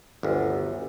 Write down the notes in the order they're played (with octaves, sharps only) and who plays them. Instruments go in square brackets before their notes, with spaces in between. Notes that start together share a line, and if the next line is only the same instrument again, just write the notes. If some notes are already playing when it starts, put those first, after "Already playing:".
[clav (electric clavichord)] G1 D2